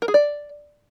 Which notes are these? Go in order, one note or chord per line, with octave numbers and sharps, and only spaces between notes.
A#4
G#4
D5